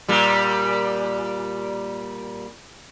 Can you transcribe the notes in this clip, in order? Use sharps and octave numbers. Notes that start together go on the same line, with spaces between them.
A#2 G3